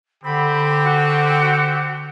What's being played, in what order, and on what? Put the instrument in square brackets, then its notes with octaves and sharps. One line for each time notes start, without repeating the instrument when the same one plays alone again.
[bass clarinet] D3 [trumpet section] C4 G4 [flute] B5
[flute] F#4